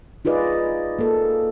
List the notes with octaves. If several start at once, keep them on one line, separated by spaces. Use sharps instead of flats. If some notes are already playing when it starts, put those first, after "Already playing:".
D#4 F4 G#4 B4 D5 D#5
A#3 A4